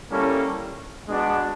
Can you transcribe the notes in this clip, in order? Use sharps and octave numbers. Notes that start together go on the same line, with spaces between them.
G3 A#3 C#4 E4 A4
G#3 B3 D4 F#4